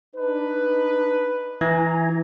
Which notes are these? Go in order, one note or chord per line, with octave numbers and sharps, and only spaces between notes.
D4 D#4 B4
E3 E4 G#5 A#5